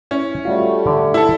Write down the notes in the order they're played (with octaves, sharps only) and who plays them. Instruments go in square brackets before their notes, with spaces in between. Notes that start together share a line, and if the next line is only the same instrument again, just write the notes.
[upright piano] C#4 [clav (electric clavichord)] E4
[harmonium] G3 A3 [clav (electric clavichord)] F4 F#4 C#5
[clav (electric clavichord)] D3 D5
[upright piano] E4 A4